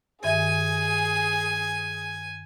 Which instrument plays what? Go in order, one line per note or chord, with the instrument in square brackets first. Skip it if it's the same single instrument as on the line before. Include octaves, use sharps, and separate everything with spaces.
[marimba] G2 D#3 E5 [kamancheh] G#4 [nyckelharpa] G#5